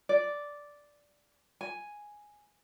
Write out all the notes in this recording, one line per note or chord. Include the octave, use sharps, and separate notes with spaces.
D5
G#5